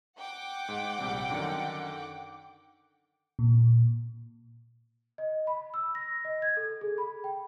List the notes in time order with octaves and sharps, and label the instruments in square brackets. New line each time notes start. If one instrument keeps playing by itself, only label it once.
[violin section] F#5 G5 D6
[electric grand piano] G#2
A#1 C3 G3
F#2 D3 D#3
[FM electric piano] A#2
[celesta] D#5
B5
E6
A#6
D#5
G#6
A4
G#4
B5
G5